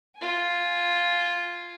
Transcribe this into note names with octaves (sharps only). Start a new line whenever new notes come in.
F4 G#5